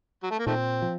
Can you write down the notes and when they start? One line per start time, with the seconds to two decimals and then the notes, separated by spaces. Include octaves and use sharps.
0.23 F#3
0.31 A3
0.39 A#3
0.46 A#2 D#3 A3 C4
0.82 F3